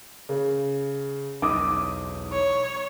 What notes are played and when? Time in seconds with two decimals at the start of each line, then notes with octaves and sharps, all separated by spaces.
0.29 C#3
1.42 B1 E2 D#4 D6 D#6
2.32 C#5